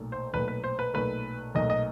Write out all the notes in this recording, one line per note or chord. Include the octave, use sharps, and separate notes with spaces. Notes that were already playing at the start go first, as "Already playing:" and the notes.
Already playing: B1 A#2 F#3 A3
C5
B1 A#2 F#3 A3 B4
B4
C5
B4
B1 A#2 F#3 A3 B4
B1 A#2 F#3 A3 D#5
D#5